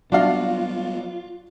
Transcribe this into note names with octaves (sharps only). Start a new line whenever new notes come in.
F#3 G3 B3 D4 F4 F#4 F5